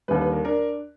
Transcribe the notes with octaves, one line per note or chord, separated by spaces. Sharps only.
D#2 D3 G3 B4
B4
A#4
D4 A#4